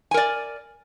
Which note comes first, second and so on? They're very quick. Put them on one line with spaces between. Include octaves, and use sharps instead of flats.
G#5 A#4 D5